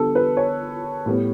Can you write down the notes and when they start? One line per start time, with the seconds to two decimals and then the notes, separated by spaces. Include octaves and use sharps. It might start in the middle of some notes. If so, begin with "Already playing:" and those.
Already playing: D3 G3 B3 A4
0.15 B4
0.37 C#5
1.06 A2 G3 B3